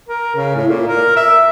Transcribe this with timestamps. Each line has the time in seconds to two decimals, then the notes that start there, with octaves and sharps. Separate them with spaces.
0.09 A#4
0.35 C#3
0.55 A2
0.68 A#2
0.88 A#4
1.17 E5